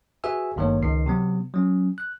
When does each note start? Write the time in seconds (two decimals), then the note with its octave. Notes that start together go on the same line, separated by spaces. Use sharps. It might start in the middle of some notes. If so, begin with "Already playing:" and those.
0.24 F#4 G#4 B4 E5 G#5 E6
0.56 G#1 G2 D#3 A3 A#3 C#5
0.82 C#2 D#3 C7
1.06 C3 F#3 B3
1.54 F#3 C#4
1.98 F#6